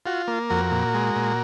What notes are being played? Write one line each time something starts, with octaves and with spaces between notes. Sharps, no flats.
F4 F#4
A#3
F2 F#4 A#4
A#2
G#3
A#2